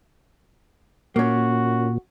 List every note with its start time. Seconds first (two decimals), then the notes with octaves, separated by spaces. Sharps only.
1.16 A#2 A#3 C#4 F#4